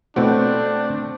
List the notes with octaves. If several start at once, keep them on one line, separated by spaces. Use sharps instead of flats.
B2 A3 C4 D4 E4 F#4